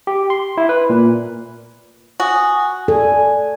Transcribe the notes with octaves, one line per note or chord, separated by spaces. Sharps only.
G4
C6
E4
B4
A#2
F#4 G#5 D#6
A4 D5 G#5